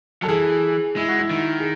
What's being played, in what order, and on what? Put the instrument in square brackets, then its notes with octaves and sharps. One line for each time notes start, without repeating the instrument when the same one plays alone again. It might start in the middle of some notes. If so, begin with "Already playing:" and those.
[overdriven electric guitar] F#3 [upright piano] A4
[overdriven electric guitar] E3 [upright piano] G#4
[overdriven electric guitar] G#3 [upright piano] E4
[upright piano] F#4
E4
[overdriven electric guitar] D#3
[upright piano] G#4